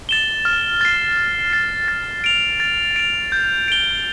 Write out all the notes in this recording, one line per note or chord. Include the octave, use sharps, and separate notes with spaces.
A6 E7 G7
F6
A6 C7
F6
A6 C7
A6
D7 F7
A6
D7 F7
G6
D7 G7